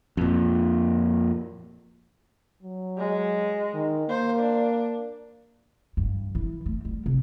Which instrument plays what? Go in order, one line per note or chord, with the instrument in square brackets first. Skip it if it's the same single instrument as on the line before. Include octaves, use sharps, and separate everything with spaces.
[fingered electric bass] F2 A#2
[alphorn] F#3
[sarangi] G#3
[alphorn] D#3
[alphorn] A#3 [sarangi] C5
[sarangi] D4
[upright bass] G2
E3
A3
G3
C3